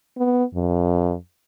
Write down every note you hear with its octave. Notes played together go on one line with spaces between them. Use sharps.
B3
F2